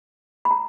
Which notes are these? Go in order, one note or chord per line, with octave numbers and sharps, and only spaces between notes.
B5
A#5